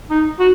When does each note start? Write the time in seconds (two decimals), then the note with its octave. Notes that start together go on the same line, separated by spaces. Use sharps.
0.10 D#4
0.39 F#4